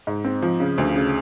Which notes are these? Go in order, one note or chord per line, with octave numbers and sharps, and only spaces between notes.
G#2
C4
F3
C#3
D2
C#3